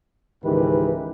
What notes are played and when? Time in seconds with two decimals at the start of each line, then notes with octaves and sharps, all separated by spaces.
0.44 C#2 G#2 D#3 E3 G4 B4